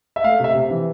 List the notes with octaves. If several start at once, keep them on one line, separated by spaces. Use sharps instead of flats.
E5
A3 F5
C3
E5
C3
E3